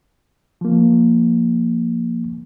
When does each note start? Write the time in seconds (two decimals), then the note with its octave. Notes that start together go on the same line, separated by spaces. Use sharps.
0.61 F3 A#3